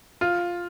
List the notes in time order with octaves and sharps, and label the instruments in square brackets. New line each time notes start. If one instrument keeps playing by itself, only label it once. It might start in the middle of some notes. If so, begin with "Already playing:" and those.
[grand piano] F4